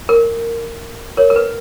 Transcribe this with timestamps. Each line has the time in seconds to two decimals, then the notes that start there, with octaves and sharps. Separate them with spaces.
0.09 A#4
1.17 A#4 C#5
1.30 A#4
1.36 B4